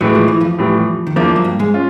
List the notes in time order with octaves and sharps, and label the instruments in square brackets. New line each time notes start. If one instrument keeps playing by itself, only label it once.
[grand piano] A2 E3 G#3 [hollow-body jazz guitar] F#3
[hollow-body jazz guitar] F3
E3
F2 F3
[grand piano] A2 E3 G3
[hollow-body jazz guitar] D#3
[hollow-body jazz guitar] E2 E3 [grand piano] F3 A#3 D4
[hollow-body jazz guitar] F#3
G2 G3
G#2 G#3
[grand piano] C#4 F4